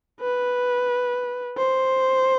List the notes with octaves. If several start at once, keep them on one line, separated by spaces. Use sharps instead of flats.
B4
C5